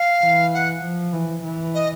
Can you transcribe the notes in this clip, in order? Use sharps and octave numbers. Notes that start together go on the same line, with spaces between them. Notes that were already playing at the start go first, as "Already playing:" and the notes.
Already playing: F5
E3
F#5
F3
E3
E3
D#5